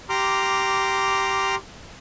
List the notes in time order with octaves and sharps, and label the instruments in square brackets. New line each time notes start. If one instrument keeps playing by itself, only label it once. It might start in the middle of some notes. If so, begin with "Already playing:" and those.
[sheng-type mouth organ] G4 A#5 C6 D6 F6